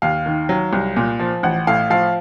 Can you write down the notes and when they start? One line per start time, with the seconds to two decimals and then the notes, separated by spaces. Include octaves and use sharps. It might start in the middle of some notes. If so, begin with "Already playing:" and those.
0.02 D#2 F5
0.26 D#3
0.49 F#3
0.73 C2
0.96 A#2
1.19 F3
1.43 A1 F#5
1.67 A2 F5
1.90 F3 F5